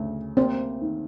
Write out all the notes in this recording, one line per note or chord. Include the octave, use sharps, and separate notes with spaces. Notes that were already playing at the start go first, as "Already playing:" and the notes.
Already playing: D2 C#3
A#3 C4
D#3